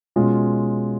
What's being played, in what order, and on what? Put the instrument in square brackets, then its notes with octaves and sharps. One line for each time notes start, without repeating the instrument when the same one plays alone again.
[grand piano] B2 G#3 C#4 F4